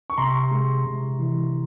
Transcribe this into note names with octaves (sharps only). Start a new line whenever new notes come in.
C#6
C3 A#5 C6
G#3
C3
E3